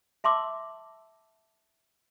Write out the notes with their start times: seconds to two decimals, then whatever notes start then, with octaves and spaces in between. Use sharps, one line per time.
0.24 E5 A5 C6 D6 E6